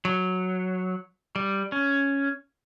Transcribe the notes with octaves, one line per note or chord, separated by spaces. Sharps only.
F#3
G3
C#4